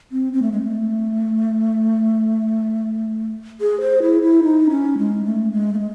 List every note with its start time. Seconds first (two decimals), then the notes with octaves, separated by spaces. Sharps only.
0.12 C4
0.33 C4
0.42 A3
0.52 G#3
0.63 A3
3.61 G#4
3.81 C5
4.02 E4
4.22 E4
4.43 D#4
4.70 C#4
4.98 G#3
5.25 A3
5.52 G#3
5.74 A3
5.79 G#3